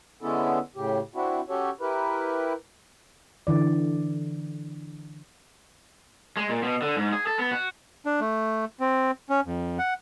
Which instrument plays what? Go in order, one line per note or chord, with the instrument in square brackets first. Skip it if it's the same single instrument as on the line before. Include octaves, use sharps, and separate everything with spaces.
[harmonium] D3 G#3 B3 C#4 E4 A4
A2 C#3 G4
C4 D4 E4 F#4
C#4 F#4 G4 A4 C#5
E4 G4 A#4 B4
[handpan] D3 E3 D5
[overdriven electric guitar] G#3
A#2
B2
D3
G#2
G#4
A4
B3
F#4
[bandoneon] D4
A3
C4
C#4
F2
F#5